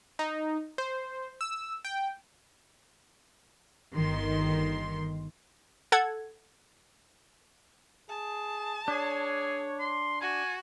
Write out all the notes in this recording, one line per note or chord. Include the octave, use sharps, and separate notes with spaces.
D#4
C5
E6
G5
G1 D#3 C6
A4 F#5 G#6
G#4 A5
D4 G#4 C#5
C6
F#4 G#5